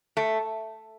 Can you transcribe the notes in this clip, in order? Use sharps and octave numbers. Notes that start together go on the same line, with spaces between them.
A3